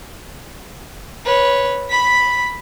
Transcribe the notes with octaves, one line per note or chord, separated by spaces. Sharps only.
B4 C#5
B5 B6